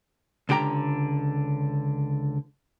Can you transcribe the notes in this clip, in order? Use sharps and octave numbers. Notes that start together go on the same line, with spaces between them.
C#2 D3 G4 G5 A#5